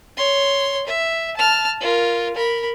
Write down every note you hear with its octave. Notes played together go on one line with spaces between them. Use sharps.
C#5 C6
E5
A5 F6
F4 A#4
A#4 B5